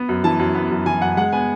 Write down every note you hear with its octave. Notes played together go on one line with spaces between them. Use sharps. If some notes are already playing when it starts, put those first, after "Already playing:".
Already playing: B3
F#2
E3 A5
F#2
B3
F#2
E3 G#5
F#2 F#5
G#3 F#5
B3 G#5